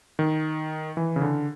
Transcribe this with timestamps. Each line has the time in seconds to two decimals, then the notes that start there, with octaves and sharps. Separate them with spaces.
0.19 D#3
0.97 E3
1.16 C#3
1.22 D3